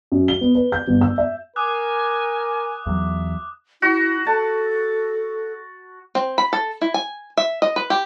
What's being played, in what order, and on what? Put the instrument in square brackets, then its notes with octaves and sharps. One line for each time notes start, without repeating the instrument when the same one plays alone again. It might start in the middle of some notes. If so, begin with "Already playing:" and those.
[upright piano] F#2
G7
B3
B4
G6
G1
E6
E5
[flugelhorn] A#4 [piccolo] G#5 [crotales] D6 D#6 F#6
[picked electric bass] E2 F#3 [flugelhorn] E5
[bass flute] E4 [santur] F#4
[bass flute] A4 [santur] A5
[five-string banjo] C4
B5
A4
E4
G#5
E5
D#5
B4
G4